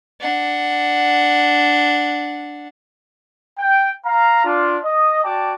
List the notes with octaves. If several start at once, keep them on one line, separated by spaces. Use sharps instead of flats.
D4 F#5
G5
F5 A#5
D4 F4
D#5
F#4 D5 G5 A5 D6